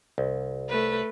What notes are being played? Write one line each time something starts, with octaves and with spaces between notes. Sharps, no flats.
C2
A3 B4